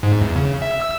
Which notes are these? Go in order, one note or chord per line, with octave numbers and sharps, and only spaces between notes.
G#2
E2
C#3
E5
E6